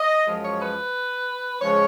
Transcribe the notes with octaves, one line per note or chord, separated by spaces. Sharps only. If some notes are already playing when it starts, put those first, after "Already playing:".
Already playing: D#5
F#2 F3 G#3
C#5
B4
C#3 F3 G#3 C#4 C#5